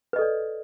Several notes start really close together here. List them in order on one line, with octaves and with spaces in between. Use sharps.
B4 D#5 A4 D5